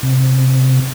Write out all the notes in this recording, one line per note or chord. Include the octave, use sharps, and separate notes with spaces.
C3